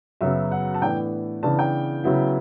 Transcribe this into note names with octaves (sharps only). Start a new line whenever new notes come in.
F#2 C#3 F#3 B3 E5
F#5
A5
A2 E3 B3 D4 G5
C#3 E3 B3 D4 A5
G5
C#3 F#3 B3 E4